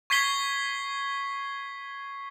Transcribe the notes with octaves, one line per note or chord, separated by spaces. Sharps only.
C#6 G#6 B6 C7 G7